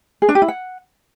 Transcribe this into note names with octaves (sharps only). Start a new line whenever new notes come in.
G#4
D4
G4
E4
F#5